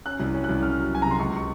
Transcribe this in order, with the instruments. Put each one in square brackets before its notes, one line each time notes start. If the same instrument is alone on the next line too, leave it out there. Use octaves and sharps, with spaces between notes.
[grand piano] C#4 F#6
C2
C#4
C2 F#6
C#4 F6
F#3
F#3 G#5
C3 A#5
C6
C#2 C#6
C#6